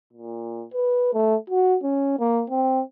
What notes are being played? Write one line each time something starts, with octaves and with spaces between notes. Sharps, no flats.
A#2
B4
A3
F#4
C#4
A#3
C4